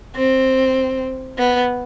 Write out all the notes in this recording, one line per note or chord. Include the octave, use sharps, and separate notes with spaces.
C4
B3